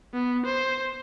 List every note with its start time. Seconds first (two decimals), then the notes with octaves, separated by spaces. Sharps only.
0.14 B3
0.46 C5